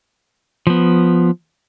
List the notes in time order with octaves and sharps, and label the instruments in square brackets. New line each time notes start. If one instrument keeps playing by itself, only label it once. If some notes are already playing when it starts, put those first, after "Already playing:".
[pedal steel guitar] F3 B3